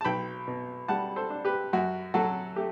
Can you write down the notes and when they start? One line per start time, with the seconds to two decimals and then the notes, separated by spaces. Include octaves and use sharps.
0.01 A5
0.05 B1 G5 B5
0.48 B2
0.88 G3 F#5 A5
1.16 A4 C5
1.30 D4
1.45 G4 B4
1.73 F#2 F#4
2.14 F#3 F#4 A4
2.56 A3 G4